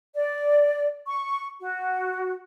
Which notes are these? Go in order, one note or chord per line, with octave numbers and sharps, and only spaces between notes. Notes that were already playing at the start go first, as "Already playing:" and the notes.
D5
C#6
F#4